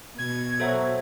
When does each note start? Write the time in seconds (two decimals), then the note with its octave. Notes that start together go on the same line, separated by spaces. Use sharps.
0.18 B2 G#6
0.60 F#3 A4 C5 E5